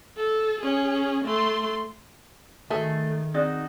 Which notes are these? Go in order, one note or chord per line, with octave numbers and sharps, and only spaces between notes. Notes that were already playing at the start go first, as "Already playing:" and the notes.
A4
C#4 G#4
A3 C6
D#3 A3 F#4 G#4 A4 E5
C4 D#4 F#4 G#4 D5